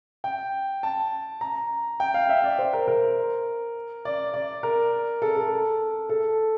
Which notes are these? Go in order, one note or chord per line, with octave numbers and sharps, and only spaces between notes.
G5
A5
A#5
G5
F5
E5
D5
C5
A#4
A#4
D5
D5
A#4
A4
A4
A4